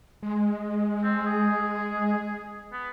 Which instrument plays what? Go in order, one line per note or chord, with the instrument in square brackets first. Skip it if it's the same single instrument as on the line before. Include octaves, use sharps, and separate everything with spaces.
[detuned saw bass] G#3
[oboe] C4
G#4
B3